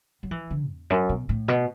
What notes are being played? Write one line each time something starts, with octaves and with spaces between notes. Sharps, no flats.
F#3
E3
D3
E2
F#2
B2
A2
B2